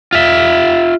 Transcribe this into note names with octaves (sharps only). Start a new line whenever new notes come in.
F4 E5